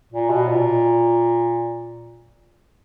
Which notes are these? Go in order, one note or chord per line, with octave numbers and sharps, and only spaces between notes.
A#2
B2
A#2